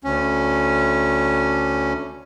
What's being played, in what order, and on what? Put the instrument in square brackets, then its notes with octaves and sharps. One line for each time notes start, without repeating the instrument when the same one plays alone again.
[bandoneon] D2 C#4